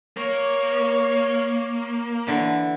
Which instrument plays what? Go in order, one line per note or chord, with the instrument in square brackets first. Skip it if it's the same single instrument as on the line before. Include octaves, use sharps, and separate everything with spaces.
[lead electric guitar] A#3 [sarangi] C#5
[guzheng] D3 E3